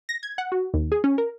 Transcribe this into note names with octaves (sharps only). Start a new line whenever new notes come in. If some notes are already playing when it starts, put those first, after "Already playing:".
A#6
G#6
F#5
F#4
D#2
G#4
C#4
A#4